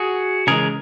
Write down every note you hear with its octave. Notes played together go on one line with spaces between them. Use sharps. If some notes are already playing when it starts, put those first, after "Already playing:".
Already playing: F#4 G#4
C#3 E3 G#3 G#4 A#4